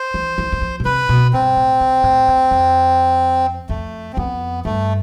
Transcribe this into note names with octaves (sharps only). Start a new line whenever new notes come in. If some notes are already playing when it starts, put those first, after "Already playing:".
Already playing: C5
E3
E3
E3
F3
B2
C3 B4
B2
G2 C4
A2
C3
A2
F2
F2
F2 A3
C4
F2 B3
G2 A3